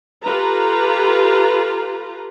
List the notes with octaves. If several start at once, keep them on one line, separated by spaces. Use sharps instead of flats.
F4 G4 A4 B4 A#5